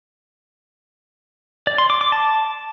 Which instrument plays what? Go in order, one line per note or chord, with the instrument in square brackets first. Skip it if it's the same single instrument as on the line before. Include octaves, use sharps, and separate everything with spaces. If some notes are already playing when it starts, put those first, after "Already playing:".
[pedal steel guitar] D5
C6
D6
D6
A5